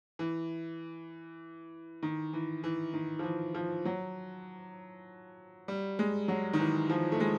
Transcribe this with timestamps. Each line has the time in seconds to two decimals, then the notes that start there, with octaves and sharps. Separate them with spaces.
0.19 E3
2.03 D#3
2.33 E3
2.64 E3
2.94 D#3
3.19 F3
3.24 E3
3.55 F3
3.85 F#3
5.68 G3
5.99 G#3
6.28 F#3
6.53 D#3
6.60 E3
6.90 F3
7.12 A3
7.20 G#3